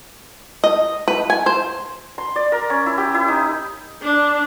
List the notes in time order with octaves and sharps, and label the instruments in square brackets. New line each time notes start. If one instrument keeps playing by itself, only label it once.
[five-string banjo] D#5
B4
G#5
C5
[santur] C6
D5
A#4
C#4
E4
G4
E4
D#4
[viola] D4